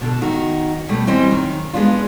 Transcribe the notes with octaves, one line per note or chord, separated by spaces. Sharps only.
B2 D3 A4
D#3 D#4 F#4
B2 G3 A3
E3 G3 C4 G4 D#5
F#2 D#3
G#3 B3 D4 F4